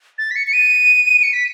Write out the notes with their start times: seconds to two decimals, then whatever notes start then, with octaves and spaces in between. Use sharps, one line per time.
0.18 A6
0.31 B6
0.36 C#7
0.47 C#7
0.53 D#7
1.23 C#7
1.33 B6